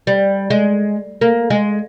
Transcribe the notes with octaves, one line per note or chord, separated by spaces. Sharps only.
G3
G#3
A#3
G#3